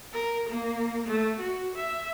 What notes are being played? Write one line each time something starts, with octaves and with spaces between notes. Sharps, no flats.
A#4
A#3
A3
F#4
E5